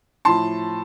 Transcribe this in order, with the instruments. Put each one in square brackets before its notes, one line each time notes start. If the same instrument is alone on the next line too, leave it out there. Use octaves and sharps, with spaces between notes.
[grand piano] A2 F3 A5 C6